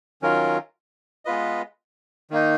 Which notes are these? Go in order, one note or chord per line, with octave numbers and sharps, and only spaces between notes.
D#3 F#3 C#4 F4 A#4
G#3 B3 F4 B4 D#5
D#3 A#3 D#4